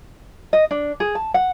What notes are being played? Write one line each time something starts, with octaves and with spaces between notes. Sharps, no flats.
D#5
D4
G#4
A5
F#5